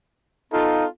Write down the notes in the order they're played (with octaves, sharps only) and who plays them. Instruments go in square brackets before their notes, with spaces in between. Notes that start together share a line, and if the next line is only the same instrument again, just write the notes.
[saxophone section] B3 F4 [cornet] D#4 [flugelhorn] A4